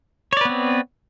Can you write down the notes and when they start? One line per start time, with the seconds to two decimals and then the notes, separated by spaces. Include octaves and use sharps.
0.33 C#5
0.37 D5
0.41 B4
0.45 B3
0.49 C4